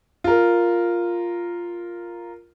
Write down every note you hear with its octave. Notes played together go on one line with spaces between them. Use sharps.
F4 A#4